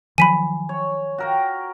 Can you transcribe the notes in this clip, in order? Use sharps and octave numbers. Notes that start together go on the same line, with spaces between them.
D#3 F3 F#3 G#5 B5 B6 D#7
C#5
F#4 A#4 G5